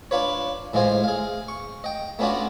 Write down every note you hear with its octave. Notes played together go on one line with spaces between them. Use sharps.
D4 F4 B4 C#5
A2 E3 G#3 F4 C5 G#5
G#4 F5
C#6
D#5 G5
A3 B3 C#4 D4 F4 F#4